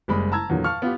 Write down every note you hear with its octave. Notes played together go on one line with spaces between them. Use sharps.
F#1 G3 G#3 B5
A5 A#5 E6 G#6
E2 A#2 D3 F#3
F5 A5 C#6 F6
B3 F4 G4